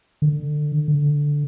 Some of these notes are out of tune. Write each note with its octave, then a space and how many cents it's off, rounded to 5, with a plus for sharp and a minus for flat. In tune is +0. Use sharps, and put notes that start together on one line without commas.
D3 +20
D3 -5